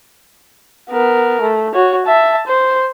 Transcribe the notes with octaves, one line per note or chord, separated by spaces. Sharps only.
B3 A#4
A3
F#4 C#5
E5 A5
C5